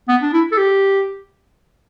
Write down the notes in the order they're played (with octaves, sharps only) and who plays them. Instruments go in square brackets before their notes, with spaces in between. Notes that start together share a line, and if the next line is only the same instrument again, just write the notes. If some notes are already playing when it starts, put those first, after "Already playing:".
[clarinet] B3
D4
E4
A4
G4